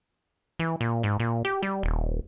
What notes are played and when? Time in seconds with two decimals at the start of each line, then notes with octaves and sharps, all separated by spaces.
0.59 E3
0.81 A#2
1.03 G#2
1.20 A#2
1.45 G4
1.63 G3
1.83 D#1